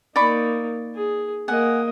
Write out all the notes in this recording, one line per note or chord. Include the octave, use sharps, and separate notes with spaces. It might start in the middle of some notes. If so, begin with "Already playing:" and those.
A#3 D#4 D5 B5 C#6
G#4
A#3 D#5 F#5 G#5